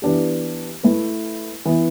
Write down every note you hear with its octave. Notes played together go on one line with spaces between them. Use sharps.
E3 B3 D4 G4
A3 E4 B4
E3 B3 E4